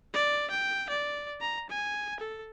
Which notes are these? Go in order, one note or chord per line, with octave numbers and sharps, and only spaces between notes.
D5
G5
D5
A#5
G#5
A4